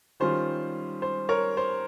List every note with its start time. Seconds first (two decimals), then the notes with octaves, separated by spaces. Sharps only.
0.20 D#3 G3 C#4 F4 C5
1.02 C5
1.29 A#4 C#5
1.57 C5